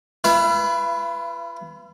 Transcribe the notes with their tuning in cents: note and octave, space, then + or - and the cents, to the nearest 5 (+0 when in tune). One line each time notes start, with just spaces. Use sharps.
F4 -40 B4 +0 E5 +45